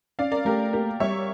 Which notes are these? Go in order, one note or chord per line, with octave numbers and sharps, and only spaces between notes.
C#4 D5 F5
A#4 D5
A3 G4 A#4
A#3 G4 A#4
G3 C#5 E5